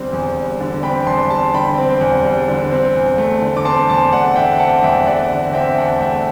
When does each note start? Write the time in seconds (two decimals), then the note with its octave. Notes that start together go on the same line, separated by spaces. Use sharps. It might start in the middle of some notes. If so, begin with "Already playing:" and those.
Already playing: E2 D3 G3 C4
0.13 E2
0.36 G3
0.60 D3
0.83 C4 G5 B5
1.06 E2 A5 C6
1.30 G3 A5 C6
1.54 D3 G5 B5
1.78 C4
2.01 E2
2.24 G3
2.48 D3
2.71 C4
2.95 E2
3.18 A3
3.42 D3
3.57 D6
3.65 C4 A5 C6
3.89 E2 A5 C6
4.13 A3 D5 F#5
4.36 D3 E5 G5
4.59 C4 F#5 A5
4.83 E2 E5 G5
5.07 A3 D5 F#5
5.30 D3
5.54 C4 E5 G5
5.77 E2 F#5 A5
6.01 A3 E5 G5
6.15 G5